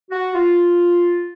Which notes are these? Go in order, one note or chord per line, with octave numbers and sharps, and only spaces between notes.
F#4
F4